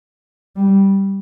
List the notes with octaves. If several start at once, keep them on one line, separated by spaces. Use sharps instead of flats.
G3